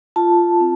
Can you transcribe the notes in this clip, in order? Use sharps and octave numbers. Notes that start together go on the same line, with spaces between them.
F4 A5
C4